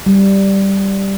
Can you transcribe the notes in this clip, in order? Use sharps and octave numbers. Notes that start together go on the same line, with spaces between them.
G3